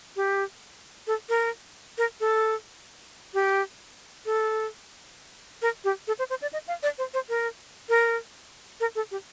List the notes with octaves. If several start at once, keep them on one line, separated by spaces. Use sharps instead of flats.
G4
A4
A#4
A#4
A4
G4
A4
A#4
G4
A4
C5
C5
D5
D#5
F5
D5
C5
C5
A#4
A#4
A#4
A4
G4